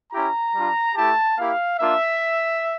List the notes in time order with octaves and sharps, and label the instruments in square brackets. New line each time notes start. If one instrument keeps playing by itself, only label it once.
[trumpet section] C#4 E4 G4 A#5
G3 D4 F4
A3 E4 G4 A5
A#3 E4 G4 F5
A#3 D4 F4 E5